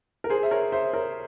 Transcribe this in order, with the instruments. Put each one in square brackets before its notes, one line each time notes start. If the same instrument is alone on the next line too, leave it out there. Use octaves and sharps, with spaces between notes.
[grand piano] A#4
G#4 C5
E5
A#4 C#5
C5 E5
A#4 C#5